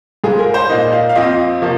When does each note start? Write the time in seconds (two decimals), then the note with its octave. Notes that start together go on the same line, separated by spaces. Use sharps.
0.24 G#2 G#3 F4 G#4
0.39 A#4
0.54 C5
0.70 A#2 A#3 D#4 D#5
0.93 F5
1.09 F5
1.15 F2 F3 C4 F4 D#5
1.62 C3 F3 A#3